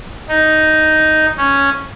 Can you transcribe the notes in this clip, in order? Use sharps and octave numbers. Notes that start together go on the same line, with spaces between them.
D#4
C#4